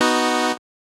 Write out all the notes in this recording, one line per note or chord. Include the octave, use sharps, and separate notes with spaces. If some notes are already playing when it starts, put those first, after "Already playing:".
B3 D#4 F#4